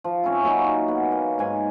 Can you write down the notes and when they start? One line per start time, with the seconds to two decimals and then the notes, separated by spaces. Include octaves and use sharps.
0.04 F3
0.24 C4 C#4 E4
0.43 F#3 A#3 C#4 D#4
0.88 B3
1.12 A#3
1.39 G#2 G#5